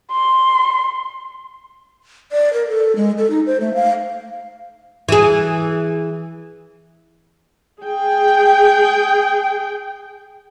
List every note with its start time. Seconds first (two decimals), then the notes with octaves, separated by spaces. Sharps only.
0.12 C6
2.32 D5
2.53 A#4
2.68 A4
2.96 G#3
3.17 A4
3.30 D#4
3.46 C5
3.60 A3
3.75 F5
5.09 E3 G#4
7.81 G#4 G5